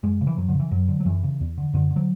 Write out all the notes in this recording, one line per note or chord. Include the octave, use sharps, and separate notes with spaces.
F#2 G#3
C#3
E3
F#2 F#3
D3
C#3
E3
F#2 F#3
D3
F#3
F#2 E3
C#3
E2
D3
F#2 D3
D3
F#3